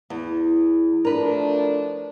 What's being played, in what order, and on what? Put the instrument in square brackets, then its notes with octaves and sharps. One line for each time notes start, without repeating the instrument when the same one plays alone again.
[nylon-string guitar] E2
[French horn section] F3 A3 D4 [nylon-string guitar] A#4 B4